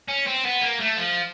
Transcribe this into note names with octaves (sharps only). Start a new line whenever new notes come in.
C#4
C4
B3
A#3
A3
F3